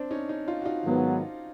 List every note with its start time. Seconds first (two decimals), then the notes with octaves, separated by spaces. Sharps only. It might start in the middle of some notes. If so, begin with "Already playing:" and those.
Already playing: C4 D4
0.11 C#4 D#4
0.29 C#4 D#4
0.48 D#4 F4
0.62 F#4
0.65 D#4 F4
0.84 G#2 D#3 F#3 B3